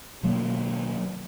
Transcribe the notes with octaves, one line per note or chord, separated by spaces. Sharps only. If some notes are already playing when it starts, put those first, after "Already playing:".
B2 D#3 F#3 A#3